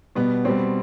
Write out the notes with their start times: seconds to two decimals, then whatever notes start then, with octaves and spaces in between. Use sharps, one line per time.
0.15 B2 G3 B3
0.45 B2 G3 C4